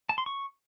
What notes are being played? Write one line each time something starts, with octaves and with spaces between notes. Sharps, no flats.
A5
C6
C#6